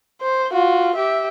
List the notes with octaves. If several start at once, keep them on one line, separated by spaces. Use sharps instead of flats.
C5
F4 F#4
G4 E5